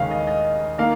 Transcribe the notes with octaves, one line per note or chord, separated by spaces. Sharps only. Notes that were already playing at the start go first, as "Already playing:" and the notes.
Already playing: D#2 C#3 G#3 C#4 F5
D#5
D#5
D#3 A#3 F5